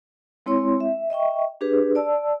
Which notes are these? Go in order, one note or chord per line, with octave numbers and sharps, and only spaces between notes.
G#3 C4 E4 C#5 C6
E5
D#5 E5 G5 C#6
D4 G4 G#4 B4
D5 A5 E6